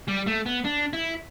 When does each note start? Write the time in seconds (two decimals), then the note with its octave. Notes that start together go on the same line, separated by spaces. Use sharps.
0.08 G3
0.27 A3
0.46 B3
0.65 D4
0.93 E4